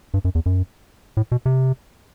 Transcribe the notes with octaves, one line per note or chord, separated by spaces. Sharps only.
G2
F#2
E2
F#2
A2
B2
C3